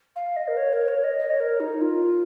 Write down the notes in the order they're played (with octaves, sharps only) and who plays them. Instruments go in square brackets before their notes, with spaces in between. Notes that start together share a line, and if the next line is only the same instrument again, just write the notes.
[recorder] F5
D#5
A#4
C#5
A#4
C#5
D#5
D#5
C#5
A#4
D#4
F4